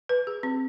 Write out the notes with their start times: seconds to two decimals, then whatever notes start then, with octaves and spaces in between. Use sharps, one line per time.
0.09 B4
0.27 G#4
0.43 C4